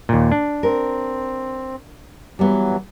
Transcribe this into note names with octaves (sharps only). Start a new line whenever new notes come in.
D#2 A#2
D4
C4 A#4
E3 F#3 G3 B3